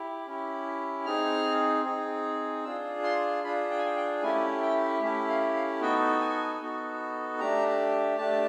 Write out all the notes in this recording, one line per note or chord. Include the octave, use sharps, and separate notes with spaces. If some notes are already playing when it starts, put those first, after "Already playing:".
Already playing: E4 G4
C#4 E4 G4
C4 D#4 G#4 F6
C4 D#4 G#4
D4 F4 G#4 E6
C6
D4 F4 G#4 B5
G5
G#5
G5
G5
A3 C#4 E4 G4 G#5
G5
A3 C#4 E4 G4 E5
F5
F5
B3 D#4 F#4 A4 G5
G#5
B3 D#4 F#4 A4
A3 D4 G4 A#5
A3 D4 G4 A5